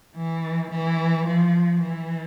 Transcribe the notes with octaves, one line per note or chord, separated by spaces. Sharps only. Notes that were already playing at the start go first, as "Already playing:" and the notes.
E3
E3
F3
E3